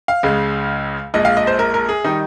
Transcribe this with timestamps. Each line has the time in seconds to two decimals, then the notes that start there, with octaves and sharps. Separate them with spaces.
0.08 F5
0.23 C#2 C#3 G#3
1.14 A#1 A#2 G#3 D#5
1.25 F5
1.37 D#5
1.47 C5
1.59 A#4
1.74 A#4
1.89 G#4
2.04 D#3 G3 D#4